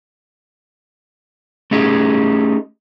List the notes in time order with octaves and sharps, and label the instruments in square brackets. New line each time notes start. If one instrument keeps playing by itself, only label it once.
[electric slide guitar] A3 C#4 D#4 G4 G#4